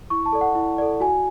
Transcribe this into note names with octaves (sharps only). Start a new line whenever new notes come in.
E4 C#6
A5
A4 D5
F#5
E4
A4 D5
F#4 G#5